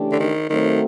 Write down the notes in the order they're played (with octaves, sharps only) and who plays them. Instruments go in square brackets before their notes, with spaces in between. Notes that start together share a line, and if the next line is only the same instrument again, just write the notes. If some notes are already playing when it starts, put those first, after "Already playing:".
Already playing: [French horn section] C#3 E3 A3 D4 G4
[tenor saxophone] D3
D#3
[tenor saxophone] D#3 [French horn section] F#3 A3 C4